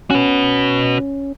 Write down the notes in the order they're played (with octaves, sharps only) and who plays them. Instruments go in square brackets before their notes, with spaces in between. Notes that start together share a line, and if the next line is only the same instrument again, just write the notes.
[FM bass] C#4 [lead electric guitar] F#4 B4